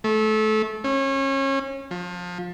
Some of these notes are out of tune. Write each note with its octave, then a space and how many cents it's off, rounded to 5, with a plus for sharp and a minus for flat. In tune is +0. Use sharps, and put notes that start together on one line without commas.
A3 -25
C#4 -30
F3 +25